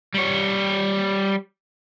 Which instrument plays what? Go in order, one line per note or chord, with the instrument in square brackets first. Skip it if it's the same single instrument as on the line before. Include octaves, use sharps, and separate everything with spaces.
[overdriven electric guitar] G3 C#5